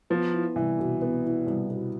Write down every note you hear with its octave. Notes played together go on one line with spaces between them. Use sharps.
F3 B3
E4
C2 E3
B2
B3
E4
C2
B2